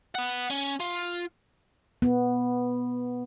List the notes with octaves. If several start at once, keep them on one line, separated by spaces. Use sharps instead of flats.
B4 F#5
C#4
F4
B3